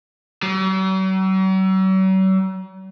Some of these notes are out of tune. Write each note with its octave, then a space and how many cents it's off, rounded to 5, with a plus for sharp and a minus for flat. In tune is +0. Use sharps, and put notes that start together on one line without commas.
F#3 +45